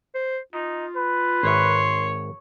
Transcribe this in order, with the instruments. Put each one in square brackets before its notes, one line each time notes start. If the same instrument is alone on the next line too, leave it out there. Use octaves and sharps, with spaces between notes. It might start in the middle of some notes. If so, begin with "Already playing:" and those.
[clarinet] C5
[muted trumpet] D#4 [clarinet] F4
[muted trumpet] B4
[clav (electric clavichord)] G#1 E5 [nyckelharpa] C#5 [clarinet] C6